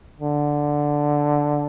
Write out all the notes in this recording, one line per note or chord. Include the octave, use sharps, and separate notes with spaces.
D3